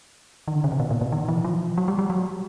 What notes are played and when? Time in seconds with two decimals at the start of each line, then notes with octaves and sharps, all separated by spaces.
0.48 D#3
0.55 D3
0.64 C#3
0.72 C3
0.80 B2
0.90 A#2
1.01 B2
1.12 D#3
1.28 E3
1.44 F3
1.78 F#3
1.88 G3
1.99 G3
2.10 F#3